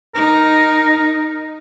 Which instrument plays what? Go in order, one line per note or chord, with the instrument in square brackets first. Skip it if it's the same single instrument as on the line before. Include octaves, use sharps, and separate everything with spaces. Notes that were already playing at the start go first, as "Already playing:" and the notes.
[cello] D#4 [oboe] A#4